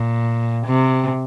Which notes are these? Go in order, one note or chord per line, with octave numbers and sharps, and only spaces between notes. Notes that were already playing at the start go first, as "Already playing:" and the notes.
Already playing: A#2
C3